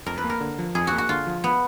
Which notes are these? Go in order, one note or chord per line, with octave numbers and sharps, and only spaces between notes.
F2 A#4
B4
A#3
A#4
D3
F3
F2 G#4
F#4
A#3
F#4
D3 F4
F3
B3